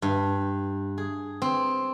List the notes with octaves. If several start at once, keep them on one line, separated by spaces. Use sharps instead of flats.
G2
G#4
C4